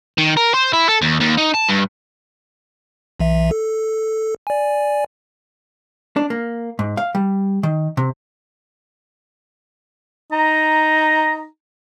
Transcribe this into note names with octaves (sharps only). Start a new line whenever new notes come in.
D#3
A#4
C5
E4
A4
D#2
D#2
D#4
A5
G2
B1 E3 E5
A4
D5 G#5
D4
A#3
G#2
F5
G3
D#3
C3
D#4 A#5